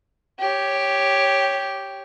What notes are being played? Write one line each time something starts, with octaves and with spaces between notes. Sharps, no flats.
G4 C#5